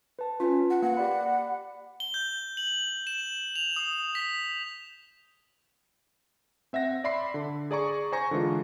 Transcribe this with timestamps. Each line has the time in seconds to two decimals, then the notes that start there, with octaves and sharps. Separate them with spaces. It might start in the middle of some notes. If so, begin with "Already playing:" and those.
0.19 B4 A5
0.40 C#4 F4 B4
0.70 F#5
0.82 A#3 F#5
0.97 G4 D5 B5
2.00 G7
2.14 G6
2.57 F#7
3.07 E7
3.55 F7
3.76 D#6
4.15 B6
6.73 C4 E5 F#5 A#6
7.04 D5 E5 B5 C6 C7
7.34 D3
7.71 G#4 D5 A#5 C#6
8.12 C5 G#5 A#5 C#6 A#6
8.31 D3 E3 G#3 F4